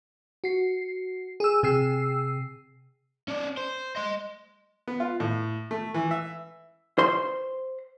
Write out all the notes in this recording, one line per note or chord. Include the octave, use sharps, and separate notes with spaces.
F#4 C7
G#4 E6
C3 G#4 E6 C7
C#4 D5
C5
D#5 C6
B3
F4
A2
A3
E3
E5
C5 C6